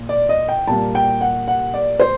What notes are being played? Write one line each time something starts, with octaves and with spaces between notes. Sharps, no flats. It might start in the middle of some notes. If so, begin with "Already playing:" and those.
Already playing: A#2
D5
D#5
G5
A#2 G3 A#3 A5
G5
F#5
F#5
D5
C5